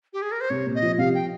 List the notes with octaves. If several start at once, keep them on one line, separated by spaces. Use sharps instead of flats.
G4
G#4
A#4
C5
C2 C#5
A#2
D#5
F3
C2 F5
G5